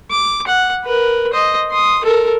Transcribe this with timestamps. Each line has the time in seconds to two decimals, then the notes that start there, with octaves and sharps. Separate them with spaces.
0.11 D6
0.47 F#5
0.85 A#4 B4
1.33 C5 D#5
1.71 C6 D#6
2.04 A4 A#4